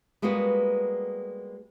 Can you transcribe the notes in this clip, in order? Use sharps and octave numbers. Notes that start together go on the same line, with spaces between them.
G3 G#3 A#3 B3 F#4 B4